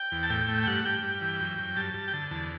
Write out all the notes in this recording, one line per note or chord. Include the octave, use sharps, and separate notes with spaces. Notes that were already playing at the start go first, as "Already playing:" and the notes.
Already playing: G5
E2
A5
A2 G5
A3
G5
G2 F#5
G2 G5
G2
E3
F#2
F#2
G2 A5
G2
G5
D3 A5
E2 A5